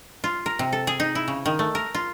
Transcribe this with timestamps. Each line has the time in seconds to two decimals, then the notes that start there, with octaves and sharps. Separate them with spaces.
0.24 F4
0.46 A#4
0.59 C3
0.73 A4
0.87 G#4
1.00 D#4
1.15 E4
1.28 C#3
1.46 D#3
1.59 A3
1.75 A#4
1.95 F4